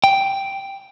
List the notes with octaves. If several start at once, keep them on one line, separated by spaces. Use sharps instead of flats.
G5